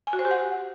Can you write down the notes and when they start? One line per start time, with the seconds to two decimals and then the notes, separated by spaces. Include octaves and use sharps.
0.07 G#5
0.13 F#4
0.19 C5
0.25 G4
0.31 F#5